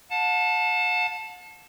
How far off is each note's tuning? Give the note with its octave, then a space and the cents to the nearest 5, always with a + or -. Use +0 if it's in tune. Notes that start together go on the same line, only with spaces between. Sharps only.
F#5 -45 A5 +0